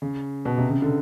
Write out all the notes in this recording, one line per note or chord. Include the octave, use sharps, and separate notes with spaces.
C#3
B2
C3
C#3
D3